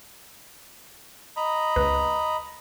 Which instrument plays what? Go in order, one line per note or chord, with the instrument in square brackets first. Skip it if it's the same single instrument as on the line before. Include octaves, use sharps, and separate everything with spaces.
[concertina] D#5 A#5 B5
[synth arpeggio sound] C#2 B4